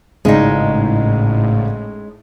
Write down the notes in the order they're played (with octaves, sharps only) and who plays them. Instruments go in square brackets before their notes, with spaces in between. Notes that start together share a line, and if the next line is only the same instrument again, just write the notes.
[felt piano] G#1 C#3 D5 [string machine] A2 [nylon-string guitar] G#3 C#4 D#4